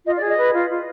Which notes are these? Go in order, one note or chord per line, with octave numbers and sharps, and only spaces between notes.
F4 D#5
D5
G#4
D#5
B4
F4
F4